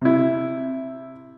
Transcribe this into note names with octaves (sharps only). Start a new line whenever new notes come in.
C3 E4